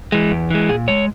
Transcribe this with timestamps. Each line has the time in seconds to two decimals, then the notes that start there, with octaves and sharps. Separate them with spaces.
0.12 E3 G#3
0.31 E2
0.50 E3 G#3
0.69 A#2 G#4
0.88 G#3 C#5